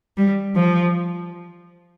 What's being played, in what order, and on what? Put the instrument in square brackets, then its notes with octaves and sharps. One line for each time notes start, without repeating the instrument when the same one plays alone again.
[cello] G3
F3